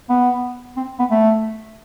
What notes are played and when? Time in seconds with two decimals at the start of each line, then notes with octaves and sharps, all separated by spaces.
0.09 B3
0.77 C4
0.99 B3
1.10 A3